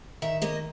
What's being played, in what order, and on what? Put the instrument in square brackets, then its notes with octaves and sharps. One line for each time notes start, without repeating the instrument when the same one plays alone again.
[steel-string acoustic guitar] D#3 E5
A#3 D#5